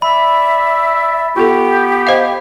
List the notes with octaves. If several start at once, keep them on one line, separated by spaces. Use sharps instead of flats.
D5 E5 B5
B3 F4 G4 A4
C5 D#5 F5